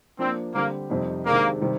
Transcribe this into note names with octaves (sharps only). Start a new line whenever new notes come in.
F3 A#3 C4 D4
D3 G3 A#3 C4 G4
F2 C3 G3 C4 D#4
C3 D#3 G#3 A#3 D4
C3 D#3 G3